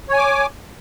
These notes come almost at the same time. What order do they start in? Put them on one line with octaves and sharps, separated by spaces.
C#5 G#5 D6